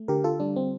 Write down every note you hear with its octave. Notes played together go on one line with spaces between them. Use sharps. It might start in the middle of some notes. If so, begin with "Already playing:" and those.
Already playing: A3
D3 G4 A#4
F4 A4
G3 D4
C4